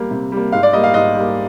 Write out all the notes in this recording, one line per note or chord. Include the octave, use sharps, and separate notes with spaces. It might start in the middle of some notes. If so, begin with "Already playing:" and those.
Already playing: G3 A#3
C3
G3
A#3
G#2 F5
D5
G3 A#3 D#5
F5
G#2 D#5
G3 A#3